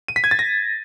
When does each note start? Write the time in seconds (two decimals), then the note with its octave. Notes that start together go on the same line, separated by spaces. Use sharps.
0.08 D#7
0.16 B6
0.24 G#6
0.31 A6
0.39 A#6